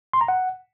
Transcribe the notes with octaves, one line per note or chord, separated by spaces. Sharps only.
C6
A#5
F#5